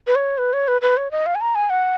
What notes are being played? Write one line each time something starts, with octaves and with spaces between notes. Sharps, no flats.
B4
C#5
B4
C#5
B4
B4
C#5
D#5
F5
G#5
A#5
G#5
F#5